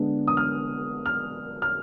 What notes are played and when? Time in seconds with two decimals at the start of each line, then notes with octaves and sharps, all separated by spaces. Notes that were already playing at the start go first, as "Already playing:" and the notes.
Already playing: D3 G#3 B3 D4
0.28 D#6
0.37 F6
1.06 F6
1.62 F6